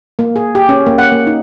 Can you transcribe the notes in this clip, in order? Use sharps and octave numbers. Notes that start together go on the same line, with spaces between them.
A#3
G#4
G4
C#4
A#3
F#5
A#3
D#4